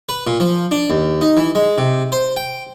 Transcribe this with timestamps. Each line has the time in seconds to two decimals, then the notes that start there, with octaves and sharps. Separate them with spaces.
0.09 B4
0.27 A#2
0.40 F3
0.71 D4
0.90 D#2
1.21 D#4
1.37 E3
1.55 G#3
1.78 C3
2.12 C5
2.36 G5